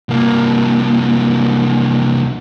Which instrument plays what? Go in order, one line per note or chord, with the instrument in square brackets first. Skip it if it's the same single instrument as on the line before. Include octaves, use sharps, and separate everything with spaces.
[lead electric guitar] C2 A#3